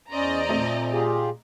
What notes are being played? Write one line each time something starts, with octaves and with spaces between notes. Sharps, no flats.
E2 C#4 C5 D5 D#5 A#5
A#2 A3 C4
F4 G4 G#4